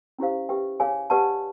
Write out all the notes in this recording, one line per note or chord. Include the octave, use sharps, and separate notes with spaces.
C#4 E4 G4 C5 F5
G4 B4 E5 G5
G#4 C#5 F5 G#5
G4 B4 D5 F#5 A5